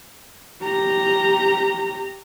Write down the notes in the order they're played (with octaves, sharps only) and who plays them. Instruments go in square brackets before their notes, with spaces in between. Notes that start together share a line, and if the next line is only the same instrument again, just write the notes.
[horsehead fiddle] G4 A#5